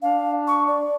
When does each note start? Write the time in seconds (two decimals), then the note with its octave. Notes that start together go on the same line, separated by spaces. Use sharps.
0.02 D4 F5
0.48 C#6
0.67 D5